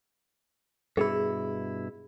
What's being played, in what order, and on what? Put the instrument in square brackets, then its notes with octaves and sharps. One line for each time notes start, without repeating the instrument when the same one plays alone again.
[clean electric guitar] G2 B2 E4 [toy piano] G#4